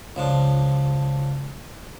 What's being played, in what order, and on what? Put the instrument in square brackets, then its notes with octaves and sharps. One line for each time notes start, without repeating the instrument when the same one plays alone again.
[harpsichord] C#2 F3 D4